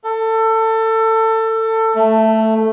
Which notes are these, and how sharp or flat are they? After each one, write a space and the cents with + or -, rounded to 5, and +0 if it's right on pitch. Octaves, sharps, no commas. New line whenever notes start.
A4 +25
A3 +5